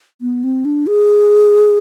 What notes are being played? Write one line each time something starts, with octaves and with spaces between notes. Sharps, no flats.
B3
C4
D4
G#4